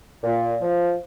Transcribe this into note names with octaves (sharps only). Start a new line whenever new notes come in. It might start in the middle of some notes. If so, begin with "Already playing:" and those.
A#2
F3